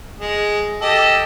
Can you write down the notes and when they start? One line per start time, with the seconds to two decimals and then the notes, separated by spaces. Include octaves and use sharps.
0.20 G#3
0.82 G4 A4 D#5